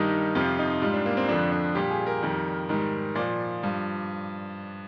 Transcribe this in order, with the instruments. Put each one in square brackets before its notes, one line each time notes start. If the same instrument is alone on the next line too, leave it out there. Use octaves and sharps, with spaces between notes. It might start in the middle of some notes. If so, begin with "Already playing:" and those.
Already playing: [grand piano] G2 D#3 G3 D#4
F2 C3 F3 F4
D#4
G#2 G3 F4
D4
A#3
C4
F2 D3 F3 D4
D4
A#2 G3 G4
G#4
A#4
F2 D#3 G3
G#2 D#3 G3
A#2 F3 D5
G2 F3